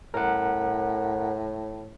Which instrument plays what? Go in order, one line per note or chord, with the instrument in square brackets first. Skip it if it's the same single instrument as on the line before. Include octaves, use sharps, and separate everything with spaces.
[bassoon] A2 [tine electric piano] A#4 F#5